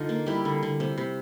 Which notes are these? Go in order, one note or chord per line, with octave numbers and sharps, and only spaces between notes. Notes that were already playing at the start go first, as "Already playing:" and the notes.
Already playing: D3 D4 D#4 F4
A#3
G3 E4
D3
D3
C3
C3